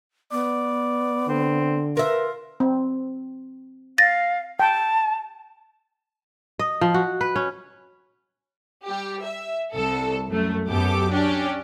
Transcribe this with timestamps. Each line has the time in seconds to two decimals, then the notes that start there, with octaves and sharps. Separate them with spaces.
0.32 B3 D5
1.28 D3 C4
1.97 F4 A#4 B4 E5
2.60 C4
3.98 F5 A6 A#6
4.60 G5 A5
6.59 D#5
6.81 F3
6.94 F#4
7.21 B4
7.36 C#4
8.86 G3 G4
9.23 E5
9.74 C2 A4
10.27 F#2 A3
10.68 F#2 B3 G4 A4 D6
11.10 C#4 D4 G4 D5